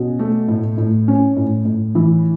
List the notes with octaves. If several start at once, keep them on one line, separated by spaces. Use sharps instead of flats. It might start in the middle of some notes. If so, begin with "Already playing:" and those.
Already playing: B2 C#4
A3
A2
A2
C#4
A2
A2
E3